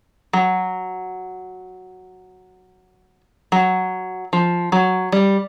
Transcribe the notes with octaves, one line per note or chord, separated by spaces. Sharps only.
F#3
F#3
F3
F#3
G3